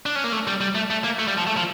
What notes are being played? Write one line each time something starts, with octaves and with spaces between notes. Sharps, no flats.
D4
C#4
A#3
A3
G3
G3
A3
A3
A#3
A3
G3
F3
A3
F3